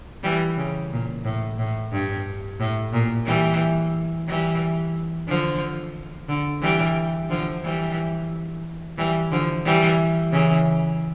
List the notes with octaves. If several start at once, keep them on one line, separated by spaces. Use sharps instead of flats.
E3 G3
C#3
A#2
A2
A2
G2
A2
A#2
E3 G3
E3 G3
D3 F3
D3
E3 G3
D3 F3
E3 G3
E3 G3
D3 F3
E3 G3
C#3 E3